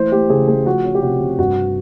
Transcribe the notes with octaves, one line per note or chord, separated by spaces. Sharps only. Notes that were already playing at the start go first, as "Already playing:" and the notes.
Already playing: E3 A3 C5
A3 G4
C#3 G#4
A3 G#4
F3 F#4
C#4
G4
C3 F#4
C3
G2 F#4